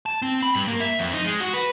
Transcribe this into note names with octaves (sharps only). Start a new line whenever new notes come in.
A5
C4
B5
G2
A#3
E5
F2
D#4
G#3
F#4
B4